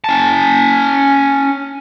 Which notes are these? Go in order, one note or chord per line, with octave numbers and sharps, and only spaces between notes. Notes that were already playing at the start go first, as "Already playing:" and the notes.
C#4 A5